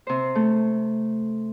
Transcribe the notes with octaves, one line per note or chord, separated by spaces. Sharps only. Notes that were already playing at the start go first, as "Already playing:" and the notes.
C3 C5
A3